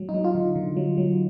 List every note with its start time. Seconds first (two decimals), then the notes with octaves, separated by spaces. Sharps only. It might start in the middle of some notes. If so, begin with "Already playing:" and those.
Already playing: F#3
0.09 D#4
0.14 F#3
0.24 F4
0.35 D3
0.55 D3
0.77 F#3
0.97 F#3